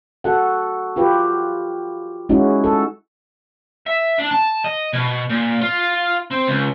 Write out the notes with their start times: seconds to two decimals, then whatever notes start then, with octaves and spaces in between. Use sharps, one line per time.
0.24 F#4 A4 F#5
0.96 F4 G4 B4
2.29 G#3 C#4 D#4 E4 F#4
2.64 A4
3.86 E5
4.19 D4
4.31 A5
4.65 D#5
4.93 B2
5.30 A#2
5.62 F4
6.31 C4
6.47 C#2